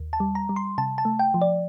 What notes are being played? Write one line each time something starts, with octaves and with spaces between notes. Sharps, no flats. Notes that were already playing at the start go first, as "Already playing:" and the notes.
Already playing: D#2
A5
G3
A#5
G3
C6
C3 A5
A5
A3
G5
F3
D5